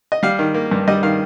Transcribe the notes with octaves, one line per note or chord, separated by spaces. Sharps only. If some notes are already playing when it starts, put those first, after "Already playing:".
D#5
G3 F5
D#3
A#3
G2
G3 D#5
D#3 F5